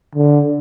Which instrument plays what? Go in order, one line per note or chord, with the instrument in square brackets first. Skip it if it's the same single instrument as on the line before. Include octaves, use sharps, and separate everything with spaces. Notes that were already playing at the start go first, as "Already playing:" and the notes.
[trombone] D3